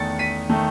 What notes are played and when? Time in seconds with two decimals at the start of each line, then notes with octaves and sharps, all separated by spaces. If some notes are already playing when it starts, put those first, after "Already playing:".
Already playing: E2 D#3 A3 A6 C#7
0.19 B6 D#7
0.49 D#3 A3